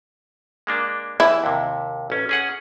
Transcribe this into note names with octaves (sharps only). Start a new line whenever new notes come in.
G#3 A#3 D4
E3 E4
D#2 C3
A1 C#4
C#4 G#4 F#5